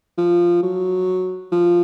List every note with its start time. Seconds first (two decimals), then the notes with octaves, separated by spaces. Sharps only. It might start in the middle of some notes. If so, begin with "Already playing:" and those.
0.18 F3
0.63 F#3
1.52 F3